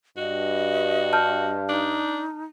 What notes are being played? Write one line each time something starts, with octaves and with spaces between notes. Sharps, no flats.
G2 F#4 D#5
A5 F6 G6
D4 D#4